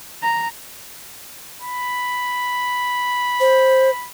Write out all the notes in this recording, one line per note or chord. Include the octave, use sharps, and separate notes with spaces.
A#5
B5
C5